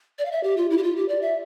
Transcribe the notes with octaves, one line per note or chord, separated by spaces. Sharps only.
D5
F5
E5
G4
F4
E4
G4
F4
G4
D5
E5